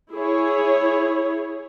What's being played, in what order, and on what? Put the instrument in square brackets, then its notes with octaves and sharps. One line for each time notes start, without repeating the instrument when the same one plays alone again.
[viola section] E4 G#4 C#5